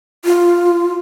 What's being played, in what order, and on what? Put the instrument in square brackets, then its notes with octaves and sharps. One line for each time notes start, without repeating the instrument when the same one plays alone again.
[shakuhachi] F4